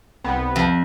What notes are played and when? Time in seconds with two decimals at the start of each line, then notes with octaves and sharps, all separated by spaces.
0.24 C2 B3 C4
0.56 F2